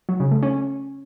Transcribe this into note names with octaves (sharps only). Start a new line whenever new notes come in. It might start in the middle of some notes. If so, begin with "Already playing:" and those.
F#3
C#3
A3
C#4